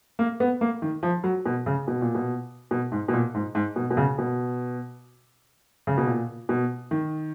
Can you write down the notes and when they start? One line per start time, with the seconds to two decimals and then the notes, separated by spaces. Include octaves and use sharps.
0.19 A#3
0.40 B3
0.61 A#3
0.82 D#3
1.03 F3
1.24 F#3
1.46 B2
1.66 C#3
1.88 B2
2.01 A#2
2.15 B2
2.71 B2
2.92 G#2
3.08 B2
3.13 A#2
3.34 G#2
3.55 G#2
3.76 B2
3.90 B2
3.97 C#3
4.18 B2
5.87 C#3
5.97 B2
6.07 A#2
6.49 B2
6.91 D#3